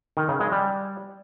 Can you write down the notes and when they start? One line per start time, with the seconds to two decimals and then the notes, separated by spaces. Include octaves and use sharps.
0.17 D#3
0.29 C#3
0.40 G#3
0.52 G3